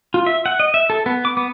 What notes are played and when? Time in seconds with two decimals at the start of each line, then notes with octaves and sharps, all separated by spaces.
0.14 F4
0.27 E5
0.46 F#5
0.60 D#5
0.74 E5
0.90 A4
1.06 B3
1.25 D6
1.37 B3